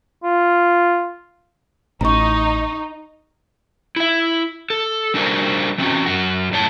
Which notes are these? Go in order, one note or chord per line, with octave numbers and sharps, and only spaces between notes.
F4
A1 D#4 A#5 C#6
E4 E5
A4
G3 D4 F#4 A4 A#4 C5
E3 C4 C#4 F#4
F#2 F#4
F#2 A2 C#5 A5